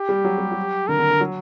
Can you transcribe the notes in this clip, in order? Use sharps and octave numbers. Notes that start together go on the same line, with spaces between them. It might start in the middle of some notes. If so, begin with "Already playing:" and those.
Already playing: G4
G3
F#3
G3
F#3
D3 A#4
D3
D3
F#3